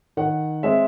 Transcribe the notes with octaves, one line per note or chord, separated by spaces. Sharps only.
D#3 F#5
G#3 C4 E5